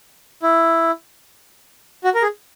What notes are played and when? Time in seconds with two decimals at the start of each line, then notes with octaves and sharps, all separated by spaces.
0.43 E4
2.04 F#4
2.15 A#4
2.22 G#4